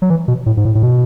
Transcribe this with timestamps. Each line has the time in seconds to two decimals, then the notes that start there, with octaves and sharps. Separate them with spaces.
0.02 F#3
0.10 E3
0.28 B2
0.46 A2
0.57 G#2
0.65 A2
0.75 A2
0.83 B2